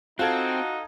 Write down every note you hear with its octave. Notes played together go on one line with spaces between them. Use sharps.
C4 D#4 F4 F#4 A4 G#6